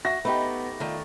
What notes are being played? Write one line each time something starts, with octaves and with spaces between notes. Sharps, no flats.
F#4 E5 A#6
A3 B3 D#4 G4 B5 C#6
D#3 A3 F4 D5